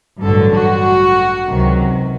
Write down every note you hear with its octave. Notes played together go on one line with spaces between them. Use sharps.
A1 G2 D3 F#3 A4
F#4
C#2 C3 D#3 F#3